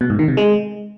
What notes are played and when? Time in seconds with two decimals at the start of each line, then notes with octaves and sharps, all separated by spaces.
0.01 B2
0.10 G#2
0.19 D#3
0.28 C3
0.37 G#3